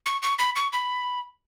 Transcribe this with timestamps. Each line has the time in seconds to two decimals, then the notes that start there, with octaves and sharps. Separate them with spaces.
0.06 C#6
0.23 C#6
0.39 B5
0.56 C#6
0.73 B5